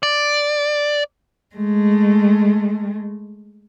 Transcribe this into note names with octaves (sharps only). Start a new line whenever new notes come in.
D5
G#3 A3